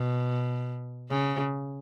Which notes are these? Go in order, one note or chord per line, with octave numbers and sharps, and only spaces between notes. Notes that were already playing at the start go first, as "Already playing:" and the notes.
Already playing: B2
C#3